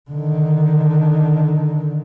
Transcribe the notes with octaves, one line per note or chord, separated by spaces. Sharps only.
D3 D#3